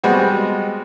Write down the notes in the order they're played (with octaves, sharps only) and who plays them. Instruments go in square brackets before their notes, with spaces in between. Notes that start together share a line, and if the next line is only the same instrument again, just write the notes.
[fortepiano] G3 G#3 B3 C4 F#4